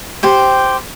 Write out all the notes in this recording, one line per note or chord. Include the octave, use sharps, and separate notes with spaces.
G4 C5 G5